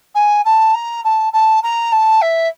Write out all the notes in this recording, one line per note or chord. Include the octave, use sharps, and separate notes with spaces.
G#5
A5
A#5
A5
A5
A#5
A5
E5